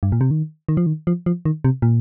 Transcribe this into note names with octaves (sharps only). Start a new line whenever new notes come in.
G2
A#2
C3
D#3
D#3
F3
D#3
F3
F3
D#3
C3
A#2